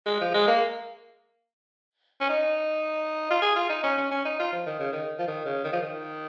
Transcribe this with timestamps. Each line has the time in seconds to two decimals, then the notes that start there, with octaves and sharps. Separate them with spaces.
0.06 G#3
0.21 F3
0.35 G#3
0.48 A#3
2.21 C#4
2.29 D#4
3.31 F4
3.42 G#4
3.56 F4
3.70 D#4
3.84 C#4
3.98 C#4
4.12 C#4
4.25 D#4
4.40 F4
4.53 F3
4.66 D#3
4.80 C#3
4.93 D#3
5.19 F3
5.28 D#3
5.46 C#3
5.64 D#3
5.73 F3
5.82 D#3